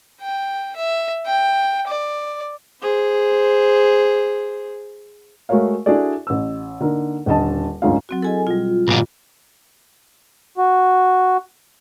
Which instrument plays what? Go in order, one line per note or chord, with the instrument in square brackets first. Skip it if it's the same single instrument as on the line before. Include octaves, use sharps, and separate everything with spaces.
[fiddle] G5
E5
G5
D5
[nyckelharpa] G#4 C5
[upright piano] G#3 A3 F#4 A#4 C#5 F5
D4 E4 F#4 G#4 A4 D5
A1 E6
D3 A#3 D#4 A#4
D#1 D3 D#5 A5
F#1 D2 G#2 C#4 F4 F5
[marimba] F#3 C4 F#4
[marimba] E4 G#4 D#5 [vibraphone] A4 G#5
[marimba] B2 G3 [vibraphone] F4
[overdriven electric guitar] B1 A#2 [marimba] G2 D#3
[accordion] F#4